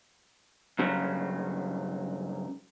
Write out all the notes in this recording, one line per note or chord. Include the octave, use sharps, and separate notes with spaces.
G2 C#3 F#3